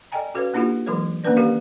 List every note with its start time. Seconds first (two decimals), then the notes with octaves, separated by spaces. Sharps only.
0.12 A4 D5 D#5 G5 G#5 A#5
0.34 C#4 F#4 A4 B4 C#5 F5
0.54 A#3 D4 E4 F4 G4 A4
0.86 E3 F#3 G#3 A4 A#4 C#5
1.24 D#3 A#3 C#4 D4 B4 D5
1.37 G4 A4 A#4 F5